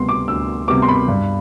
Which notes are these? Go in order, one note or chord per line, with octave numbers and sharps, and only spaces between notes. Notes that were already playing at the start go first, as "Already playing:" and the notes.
Already playing: D2 C3 G3 B3 C6
D6
D2 E6
C3 G3 B3 D6
C6
B5
G2